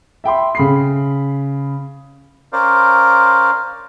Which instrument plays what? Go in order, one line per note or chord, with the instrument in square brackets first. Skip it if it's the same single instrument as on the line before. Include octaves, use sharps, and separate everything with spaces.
[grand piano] E5 G5 B5 C6
C#3 B5 C7
[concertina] C#4 A#4 C5 D5 F5